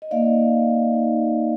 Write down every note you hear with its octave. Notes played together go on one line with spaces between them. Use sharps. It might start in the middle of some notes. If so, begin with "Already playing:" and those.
D#5
A#3 D#4 D5 F5
A#3 D#4